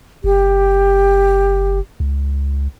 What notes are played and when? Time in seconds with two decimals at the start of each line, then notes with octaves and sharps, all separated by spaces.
0.24 F#1 G4
2.00 C#2